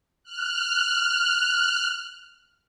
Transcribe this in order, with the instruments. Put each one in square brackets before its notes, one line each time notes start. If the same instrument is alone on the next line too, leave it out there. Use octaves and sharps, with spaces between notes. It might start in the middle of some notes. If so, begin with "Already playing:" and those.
[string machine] F6 F#6